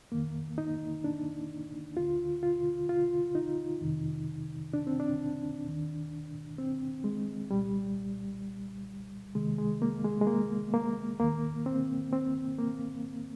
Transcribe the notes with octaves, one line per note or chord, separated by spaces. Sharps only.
F2 D#3 A#3
D#4
D4
D2 D3 F4
F4
F4
D#4
F2 C3 D#3
D4
C4
D4
D#2 D#3
C4
G#3
C2 A#2 G3
C2 C3 D#3 G#3
G#3
A#3
G#3
G#3
A#3
A#3
D#2 D#3 A#3
C4
C4
A#3